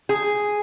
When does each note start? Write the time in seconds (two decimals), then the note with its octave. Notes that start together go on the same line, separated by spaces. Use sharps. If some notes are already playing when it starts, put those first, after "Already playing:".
0.09 G#4